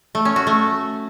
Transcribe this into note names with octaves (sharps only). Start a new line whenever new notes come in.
A3
C#4
F#4
A3